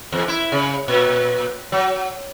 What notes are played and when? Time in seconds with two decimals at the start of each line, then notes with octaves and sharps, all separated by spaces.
0.12 E2
0.28 E4
0.52 C#3
0.88 A#2
1.72 F#3